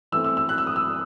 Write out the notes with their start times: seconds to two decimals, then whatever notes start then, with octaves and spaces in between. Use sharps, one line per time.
0.12 E3 A3 C4 E6
0.24 E6
0.37 E6
0.49 F#6
0.58 E6
0.67 D#6
0.76 E6